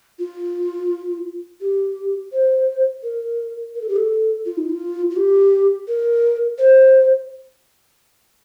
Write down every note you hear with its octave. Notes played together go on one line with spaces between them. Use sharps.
F4
G4
C5
A#4
A#4
A4
G4
A4
F4
D#4
F4
F4
G4
A#4
C5